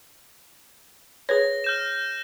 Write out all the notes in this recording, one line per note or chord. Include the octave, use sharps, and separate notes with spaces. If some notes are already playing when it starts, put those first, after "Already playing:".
G#4 B4 C#5 A#6
F6 G6 E7